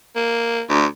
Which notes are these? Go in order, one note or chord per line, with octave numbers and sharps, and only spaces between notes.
A#3
D2